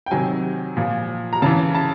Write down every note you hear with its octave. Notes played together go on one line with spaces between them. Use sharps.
G5
C3 D#3 F#3 G#5
A#2 F3
A#5
C#3 E3 A5
A5